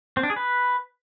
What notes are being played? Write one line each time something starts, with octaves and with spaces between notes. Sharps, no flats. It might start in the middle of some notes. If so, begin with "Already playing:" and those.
C4
D4
G#4
B4